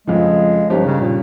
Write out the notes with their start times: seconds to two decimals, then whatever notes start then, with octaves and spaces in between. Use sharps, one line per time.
0.07 F2 C#3 F3 G#3
0.70 G2 D#3 F3 A#3 C#4 G4
0.85 C#3
1.01 A#2